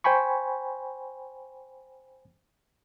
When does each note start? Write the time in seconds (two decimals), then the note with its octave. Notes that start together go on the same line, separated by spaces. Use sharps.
0.04 C5 G5 G#5 B5 C#6